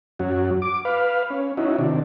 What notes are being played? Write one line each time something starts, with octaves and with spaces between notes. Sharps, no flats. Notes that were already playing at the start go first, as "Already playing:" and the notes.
F#2 C#4 F#4
D6
B4 F5
C#4
C#4 D#4 E4 F#4
C3 D#3 D4